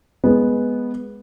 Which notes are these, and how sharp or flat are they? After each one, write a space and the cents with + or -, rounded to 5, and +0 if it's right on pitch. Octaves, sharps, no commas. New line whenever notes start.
G#3 +0 B3 -10